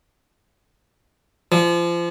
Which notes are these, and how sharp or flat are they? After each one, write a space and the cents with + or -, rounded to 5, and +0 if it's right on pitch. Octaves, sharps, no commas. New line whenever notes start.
F3 -30